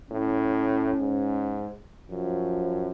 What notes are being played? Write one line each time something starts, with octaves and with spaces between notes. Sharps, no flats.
A2 C#4
G#2
F#2 F3